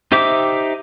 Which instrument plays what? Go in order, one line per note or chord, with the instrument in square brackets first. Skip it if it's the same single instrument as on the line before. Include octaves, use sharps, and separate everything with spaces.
[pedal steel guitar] D#4 G4 C5 E5 D6